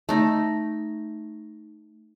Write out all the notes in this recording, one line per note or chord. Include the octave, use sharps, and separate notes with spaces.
A3 D#4